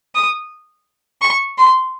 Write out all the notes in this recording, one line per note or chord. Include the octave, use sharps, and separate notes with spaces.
D#6
C#6
C6